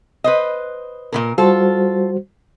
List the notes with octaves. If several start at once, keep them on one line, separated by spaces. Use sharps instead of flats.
B4 C5 D#5
A#2 D#3 A#4
G3 F4 F#4 A4 C5